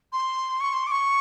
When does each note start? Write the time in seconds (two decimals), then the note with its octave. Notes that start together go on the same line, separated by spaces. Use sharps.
0.13 C6
0.60 C#6
0.73 C6
0.87 D6
0.92 C#6